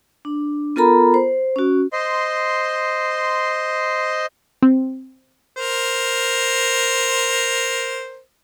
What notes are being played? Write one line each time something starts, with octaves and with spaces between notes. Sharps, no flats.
D4
B3 F4 A4 A#4 A#5 B5
C5
C#4 F#4
C5 D#5 C6
C4
A#4 C5